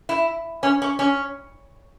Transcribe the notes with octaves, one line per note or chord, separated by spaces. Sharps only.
E4
C#4
C#4
C#4